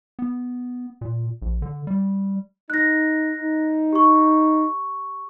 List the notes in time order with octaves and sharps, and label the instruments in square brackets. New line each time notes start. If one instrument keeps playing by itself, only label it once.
[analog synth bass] B3
A#2
A#1
D3
G3
[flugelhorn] D#4 [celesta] F#6 A#6
[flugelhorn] D#4
[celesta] G4 C#6